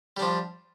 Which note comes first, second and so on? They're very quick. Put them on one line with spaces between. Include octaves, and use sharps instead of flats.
G3 D4 F3